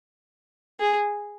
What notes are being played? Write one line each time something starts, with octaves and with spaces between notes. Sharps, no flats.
G#4